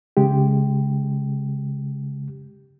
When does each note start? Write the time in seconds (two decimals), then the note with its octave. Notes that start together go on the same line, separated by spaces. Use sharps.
0.17 C#3 G#3 G4